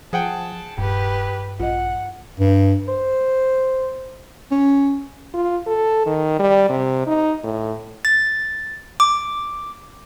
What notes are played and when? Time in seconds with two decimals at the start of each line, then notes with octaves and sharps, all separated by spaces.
0.13 F3 G#4 F#5 G5 A5
0.78 D#1 G2 G4 B4
1.60 A#1 F4 D#5 F#5
2.40 G2
2.88 C5
4.52 C#4
5.34 F4
5.66 A4
6.06 D#3
6.39 G3
6.69 C3
7.07 D#4
7.44 A2
8.05 A6
9.00 D6